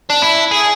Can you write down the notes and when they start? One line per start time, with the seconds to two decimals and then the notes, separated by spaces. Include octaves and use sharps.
0.10 D4
0.22 E4
0.51 G#4